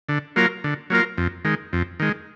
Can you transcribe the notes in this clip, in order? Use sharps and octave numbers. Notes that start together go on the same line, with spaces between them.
D3
F#3 A#3 F4 A#4
D3
F#3 A#3 F4 A#4
F2
D#3 G#3
F2
D#3 G#3